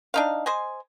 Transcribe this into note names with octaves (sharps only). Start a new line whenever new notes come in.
D4 D#4 F5
C5 D#5 G#5